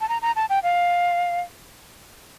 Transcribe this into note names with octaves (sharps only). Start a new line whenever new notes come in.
A5
A#5
A#5
A5
G5
F5